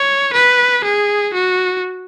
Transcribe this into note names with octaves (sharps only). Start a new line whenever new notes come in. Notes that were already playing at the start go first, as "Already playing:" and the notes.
Already playing: C#5
B4
G#4
F#4